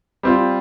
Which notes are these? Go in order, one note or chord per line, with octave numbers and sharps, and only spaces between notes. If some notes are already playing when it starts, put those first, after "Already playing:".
G3 C4 F4